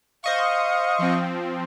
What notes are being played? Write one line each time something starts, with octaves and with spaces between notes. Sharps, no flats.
C5 D#5 F5 C#6
F3 C4